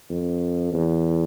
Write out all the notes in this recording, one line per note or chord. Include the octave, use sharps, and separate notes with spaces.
F2
E2